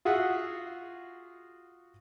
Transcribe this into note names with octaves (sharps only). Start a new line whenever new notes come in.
F4 F#4 G#4 E5 F#5